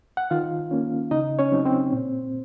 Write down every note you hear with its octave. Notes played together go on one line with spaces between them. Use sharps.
F#5
D#3 F4 F5
A#3 C#4
C#3 D#4 D#5
C#4 C#5
F#3 C4 D#4
C4 C5
A#2